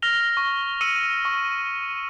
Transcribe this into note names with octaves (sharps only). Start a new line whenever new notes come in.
F6 A#6 F7 G7
C#6
E6 C#7 D#7
C#6